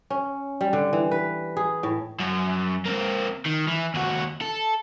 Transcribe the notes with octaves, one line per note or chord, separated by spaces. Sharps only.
C#4
G3
D3
E3
B4
G#4
A2
F#2
A#3 C4
D#3
E3
D#2 F#4
A4